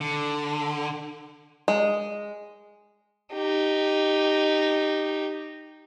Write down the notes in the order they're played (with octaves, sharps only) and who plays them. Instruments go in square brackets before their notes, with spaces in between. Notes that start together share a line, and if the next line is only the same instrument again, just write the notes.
[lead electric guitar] D3
[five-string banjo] G#3
[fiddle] D#4 G4